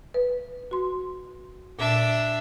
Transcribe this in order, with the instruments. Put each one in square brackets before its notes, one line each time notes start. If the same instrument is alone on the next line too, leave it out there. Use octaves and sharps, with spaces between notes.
[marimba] B4
F#4 C6
[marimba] A#2 [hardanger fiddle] D4 E5